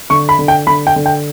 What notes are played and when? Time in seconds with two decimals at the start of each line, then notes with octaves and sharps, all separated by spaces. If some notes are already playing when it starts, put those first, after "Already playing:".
0.10 D3 C#6
0.29 B5
0.39 D3
0.48 G5
0.67 D3 B5
0.87 G5
0.96 D3
1.06 G5